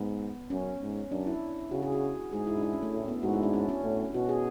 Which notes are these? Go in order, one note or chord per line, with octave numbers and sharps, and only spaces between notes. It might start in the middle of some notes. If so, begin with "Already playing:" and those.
Already playing: G#2 B3
F#2 C#4
G#2
F#2 D4
E4
C#3 F#4
G#4
F#4
G#2 G#4
E4
D4
E4
C#4
A3
A2
B3
G#2 F#4
E4
D4
C#4
C#4
A2
B2 F#4
G#4